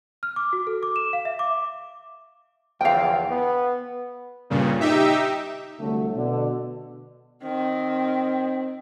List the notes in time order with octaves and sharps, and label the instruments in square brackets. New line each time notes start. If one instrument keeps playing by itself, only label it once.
[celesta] F6
D6
F#4
A4
D6
E7
F5
E5
D6
[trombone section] E2 D3 F3 [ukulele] F5 G5
[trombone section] B3
[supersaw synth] G2 A#2 C#3
D#4 G4 E5
[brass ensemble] C2 D3 F#3 A3
B2 D3
[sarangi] D#3 [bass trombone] C4